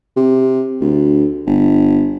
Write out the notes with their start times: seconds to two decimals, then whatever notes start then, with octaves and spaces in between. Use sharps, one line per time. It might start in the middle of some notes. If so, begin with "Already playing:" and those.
0.17 C3
0.81 D2
1.47 G1